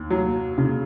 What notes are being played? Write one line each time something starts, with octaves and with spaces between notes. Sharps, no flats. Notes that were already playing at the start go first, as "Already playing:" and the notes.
Already playing: D#2
F#3
C#3